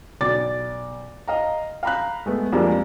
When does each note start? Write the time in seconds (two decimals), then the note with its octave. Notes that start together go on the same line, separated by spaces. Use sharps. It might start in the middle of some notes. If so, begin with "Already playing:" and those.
0.21 B1 D5 D6 A6
1.28 D#5 F5 A#5
1.83 F5 A#5 B5 F#6
2.26 G#3 A3 B3
2.53 F2 G3 G#3 A#3 D4